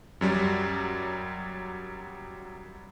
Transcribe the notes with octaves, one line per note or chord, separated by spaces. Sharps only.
F#2 F#3 G3